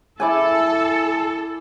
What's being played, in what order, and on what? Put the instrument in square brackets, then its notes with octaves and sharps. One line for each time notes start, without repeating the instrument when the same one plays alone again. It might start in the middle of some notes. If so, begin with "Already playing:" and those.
[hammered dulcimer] E4 D5 G#5 [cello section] A4